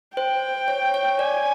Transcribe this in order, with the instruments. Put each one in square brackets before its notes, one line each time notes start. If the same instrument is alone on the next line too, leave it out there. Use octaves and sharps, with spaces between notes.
[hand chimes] C5 [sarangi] G5
[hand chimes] C#5
C#5
[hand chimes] D5 [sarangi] G#5